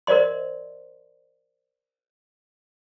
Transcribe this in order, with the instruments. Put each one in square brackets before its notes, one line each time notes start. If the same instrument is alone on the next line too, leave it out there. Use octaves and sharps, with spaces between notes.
[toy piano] A#4 C5 D5 D#5 C6